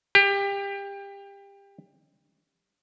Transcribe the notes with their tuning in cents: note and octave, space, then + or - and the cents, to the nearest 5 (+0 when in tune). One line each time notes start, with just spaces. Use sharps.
G4 +25